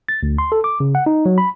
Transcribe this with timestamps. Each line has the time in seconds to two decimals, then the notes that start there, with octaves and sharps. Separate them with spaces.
0.09 A6
0.23 D2
0.38 C6
0.52 A4
0.64 D6
0.80 C#3
0.95 F#5
1.06 D#4
1.26 F#3
1.38 B5